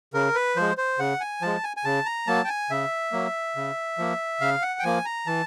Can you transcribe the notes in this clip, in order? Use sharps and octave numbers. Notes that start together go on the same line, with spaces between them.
C#3 A#4
B4
F3 G#3 C5
C5
C#3 F#5
G#5
F3 G#3 A5
G#5
G#5
C#3 A5
A#5
F#3 A#3 A5
G5
G#5
C#3 E5
F#3 A#3
C#3
F3 A#3
C#3 F5
F#5
G5
F3 A#3 G#5
A#5
E3 A5